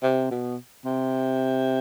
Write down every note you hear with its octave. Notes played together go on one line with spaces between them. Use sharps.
C3
B2
C3